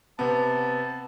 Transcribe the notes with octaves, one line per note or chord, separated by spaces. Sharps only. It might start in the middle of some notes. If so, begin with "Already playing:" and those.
C3 B3 A5